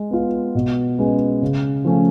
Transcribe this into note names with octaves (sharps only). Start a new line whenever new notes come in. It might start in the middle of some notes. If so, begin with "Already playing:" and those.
Already playing: G#3
B3 F4
B2
G#3 C#4 G#4 B4
C#3
F3 A3 C#4